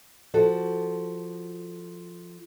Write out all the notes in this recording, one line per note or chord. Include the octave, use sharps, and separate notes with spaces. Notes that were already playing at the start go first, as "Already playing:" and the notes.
F3 F#4 A4